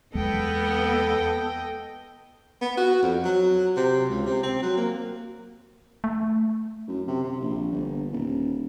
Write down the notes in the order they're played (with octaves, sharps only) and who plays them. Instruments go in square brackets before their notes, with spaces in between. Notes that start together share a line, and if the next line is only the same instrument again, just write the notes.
[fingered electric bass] E2 F#3 G#3 [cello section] B3 [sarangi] A4 [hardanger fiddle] D#5 G5
[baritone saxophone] B3
F#4
F2
F#3
C3
C#2
C3
C4
F#3
A#3
[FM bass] A3
[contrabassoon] F#2
C3
C3
A#1
G1
D#1